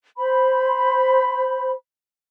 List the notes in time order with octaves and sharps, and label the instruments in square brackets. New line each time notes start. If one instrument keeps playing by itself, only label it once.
[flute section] C5 B5